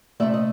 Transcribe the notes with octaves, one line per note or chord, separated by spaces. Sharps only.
C3 F3 A3 D5 E5
D#5